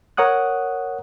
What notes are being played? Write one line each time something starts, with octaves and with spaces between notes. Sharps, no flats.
A#4 C#5 F#5 D#6 F#6